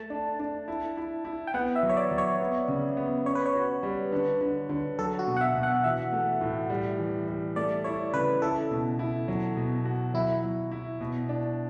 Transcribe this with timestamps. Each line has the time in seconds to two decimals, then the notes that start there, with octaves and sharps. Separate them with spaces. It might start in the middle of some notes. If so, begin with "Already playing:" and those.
Already playing: A3 A5
0.10 D4
0.39 D4
0.68 E4
0.97 E4
1.25 E4
1.47 G5
1.54 B3 F#5
1.76 E5
1.83 F#3
1.89 C#5
1.97 D5
2.11 F#3
2.18 C#5
2.40 B3
2.68 C#3
2.97 B3
3.26 C#4 C#5
3.35 B4
3.46 C#5
3.55 F#4
3.83 G3
4.12 D3
4.41 D3
4.69 D3
4.99 F#3 A4
5.19 F#4
5.27 B2
5.37 F#5
5.41 E5
5.55 B2
5.63 F#5
5.84 E3 E5
6.13 A3
6.41 A2
6.70 G3
6.98 E3
7.28 G3
7.56 A3 D5
7.84 E4 C#5
8.13 C#3 B4
8.42 E4 A4
8.71 B2
8.99 E4
9.28 F#3
9.57 B2
9.85 F#4
10.14 F#3 E4
10.43 F#3
10.72 E4
11.01 B2
11.29 D4